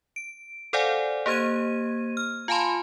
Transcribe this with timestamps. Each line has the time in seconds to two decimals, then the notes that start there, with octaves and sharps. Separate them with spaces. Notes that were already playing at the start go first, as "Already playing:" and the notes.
0.16 D7
0.73 A4 C5 D5 F5 F#5 G#5
1.26 A#3 G4 C5 G#6 D#7
2.17 F6
2.48 F4 F5 G#5 A5 B5 C6